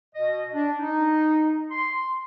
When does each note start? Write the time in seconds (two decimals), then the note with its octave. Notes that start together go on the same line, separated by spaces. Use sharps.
0.15 B2 D#5
0.53 D4
0.79 D#4
1.72 C6